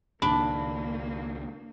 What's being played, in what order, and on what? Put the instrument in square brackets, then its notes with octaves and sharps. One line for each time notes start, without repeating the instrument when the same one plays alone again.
[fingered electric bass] C#2 A#2 D#3 [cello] A#3 [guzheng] D4 [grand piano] B5